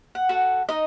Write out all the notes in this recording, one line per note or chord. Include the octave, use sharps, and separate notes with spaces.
F#5
F#4 A4
D#4 D#5